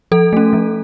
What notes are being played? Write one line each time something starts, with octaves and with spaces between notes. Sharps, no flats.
F3 A4
A3 C#4
F3